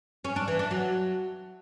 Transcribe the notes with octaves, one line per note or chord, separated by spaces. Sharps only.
C#4
D4
E3
D4
F#3